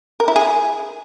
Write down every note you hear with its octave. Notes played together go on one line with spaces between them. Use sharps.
A#4
E4
G#4